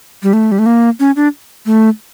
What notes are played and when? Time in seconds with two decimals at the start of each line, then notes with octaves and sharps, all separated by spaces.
0.23 G3
0.33 A3
0.52 G3
0.59 A3
0.66 A#3
1.00 C#4
1.16 D4
1.66 A3